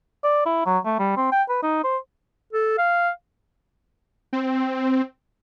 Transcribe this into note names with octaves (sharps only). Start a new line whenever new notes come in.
D5
E4
F#3
A3
G3
C4
G5
B4
D#4
C5
A4
F5
C4